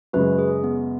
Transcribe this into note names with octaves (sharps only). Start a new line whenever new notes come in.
F#2 C#3 G#3 F#4 B4
G#4
B3